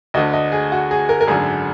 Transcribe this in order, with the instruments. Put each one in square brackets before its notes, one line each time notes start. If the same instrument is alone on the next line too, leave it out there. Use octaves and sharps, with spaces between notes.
[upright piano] D2 D#5
D3
D#5
G#4
F#4
G#4
A#4
A#4
G#1 F#2 D3 G#4